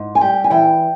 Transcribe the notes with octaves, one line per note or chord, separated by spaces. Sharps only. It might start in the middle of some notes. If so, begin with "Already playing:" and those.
Already playing: G#2
G#5
G3 G5
G#5
E3 G5